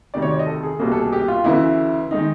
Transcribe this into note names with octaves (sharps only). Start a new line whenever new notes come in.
D2 C3 D#3 D5
C#5
D5
D#5
A4
G#4
C2 B2 G3 A#3 G#4
A4
G#4
G4
F4
D2 C#3 E3 A3 E4
D#3 G#3 D#4